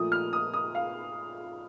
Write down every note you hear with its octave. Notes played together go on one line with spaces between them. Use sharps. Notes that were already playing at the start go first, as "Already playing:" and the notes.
Already playing: A#2 F3 A3 D#6
F6
D#6
D#6
F5